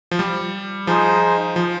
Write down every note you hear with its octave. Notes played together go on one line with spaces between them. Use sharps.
F3
G3
F3 D#4 G#4 C5 D#5
F3